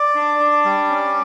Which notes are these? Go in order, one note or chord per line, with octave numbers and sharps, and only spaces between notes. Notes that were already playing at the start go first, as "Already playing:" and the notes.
Already playing: D5
D4
D4
G3
C#4